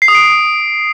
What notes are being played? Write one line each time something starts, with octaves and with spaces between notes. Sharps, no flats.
C7
D#6
D7